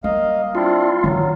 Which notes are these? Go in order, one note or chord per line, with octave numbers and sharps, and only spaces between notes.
G3 A#3 D#5 F5
C4 D4 E4 F4
D#3 E3 F#3